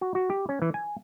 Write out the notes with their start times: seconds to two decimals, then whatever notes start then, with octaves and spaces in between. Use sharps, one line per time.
0.01 F#4
0.15 F#4
0.30 G4
0.49 C#4
0.62 E3
0.74 G#5